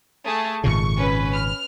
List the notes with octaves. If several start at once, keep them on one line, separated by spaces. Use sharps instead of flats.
A3 G#4 A5
G#1 A#2 C#3 C#6
C#4 B4
F6